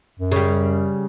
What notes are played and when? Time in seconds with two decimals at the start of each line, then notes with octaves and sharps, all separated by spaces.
0.19 F#2
0.32 C#3 G3